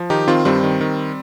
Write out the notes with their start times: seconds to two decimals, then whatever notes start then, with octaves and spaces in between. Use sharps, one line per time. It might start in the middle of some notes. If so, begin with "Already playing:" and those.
Already playing: F3
0.10 D#3 D#4 G4
0.28 D#3 C4 F4
0.45 G2 G3 C4
0.63 D#3
0.81 D#3